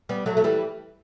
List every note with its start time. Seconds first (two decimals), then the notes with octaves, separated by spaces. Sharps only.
0.09 G3 B3
0.26 F#3 A3
0.37 A3
0.44 E3 G3